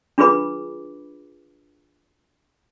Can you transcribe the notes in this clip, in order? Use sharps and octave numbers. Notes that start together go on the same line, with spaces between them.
D4 F4 G#4 B4 B5 D6